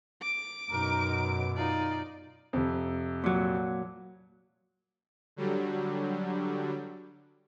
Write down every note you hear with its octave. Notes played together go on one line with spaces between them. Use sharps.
D6 D7
F#2 B2 D#4 A#4
D#4 F4 D5
F2 C3
A#2 F#3
D3 F#3 G3